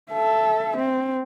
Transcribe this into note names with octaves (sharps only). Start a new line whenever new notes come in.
A4 E5
C4